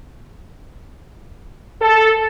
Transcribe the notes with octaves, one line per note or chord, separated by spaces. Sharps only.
A4